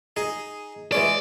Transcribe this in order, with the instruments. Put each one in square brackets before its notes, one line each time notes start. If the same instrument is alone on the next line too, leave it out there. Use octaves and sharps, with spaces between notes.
[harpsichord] D#4 G#4
[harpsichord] E3 G#3 C#4 [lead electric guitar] D5